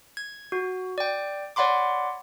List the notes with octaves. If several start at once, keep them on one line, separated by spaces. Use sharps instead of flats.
G#6
F#4
D5 G5
C#5 D5 F#5 B5 C6 D6